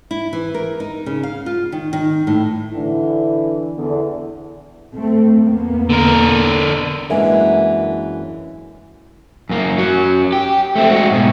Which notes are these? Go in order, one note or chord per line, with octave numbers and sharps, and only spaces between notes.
E4
E3
A#4
D#4
C#3
F5
F4
D#3
D#3
A2
D3 E3 E4
E2 D3
A3 C4
E2 A#3 B3
D3 A#4
F#2 E3 G#3 A#3 D4
F#2 A#3
F#2 F#3
G4
A3 C4
G#3 F#4
G#2 B2